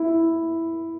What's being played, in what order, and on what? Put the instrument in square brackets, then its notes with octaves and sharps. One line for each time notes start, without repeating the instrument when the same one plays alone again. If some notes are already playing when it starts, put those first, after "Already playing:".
Already playing: [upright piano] E4